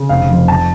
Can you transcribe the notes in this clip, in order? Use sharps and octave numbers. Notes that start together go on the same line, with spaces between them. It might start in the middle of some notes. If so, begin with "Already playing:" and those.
Already playing: C#3
F1 F5
F2
F2 A5